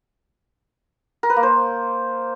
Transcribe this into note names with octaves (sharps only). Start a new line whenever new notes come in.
A#4
B4
A#3
C5